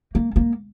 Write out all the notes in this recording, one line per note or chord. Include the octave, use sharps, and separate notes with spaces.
A#3
A#3